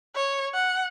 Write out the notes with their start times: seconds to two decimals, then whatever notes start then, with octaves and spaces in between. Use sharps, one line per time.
0.15 C#5
0.54 F#5